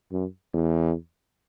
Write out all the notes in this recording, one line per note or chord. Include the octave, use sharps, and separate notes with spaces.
F#2
E2